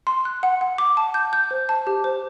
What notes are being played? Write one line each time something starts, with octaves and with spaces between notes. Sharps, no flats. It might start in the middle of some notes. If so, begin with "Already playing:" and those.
C6
F#6
F#5
F#5
D6
A5
G6
G6
C5
A5
G4
C5